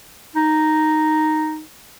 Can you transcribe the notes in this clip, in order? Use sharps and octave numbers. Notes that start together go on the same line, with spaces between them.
D#4